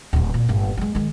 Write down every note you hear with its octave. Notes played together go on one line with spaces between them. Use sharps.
D1 D2
A#2
G1 A#3
G3 G#3
D#3 G#3